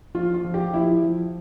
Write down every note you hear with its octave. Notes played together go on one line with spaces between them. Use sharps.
F3 F4
F4
F3
G4
F3 E4
F3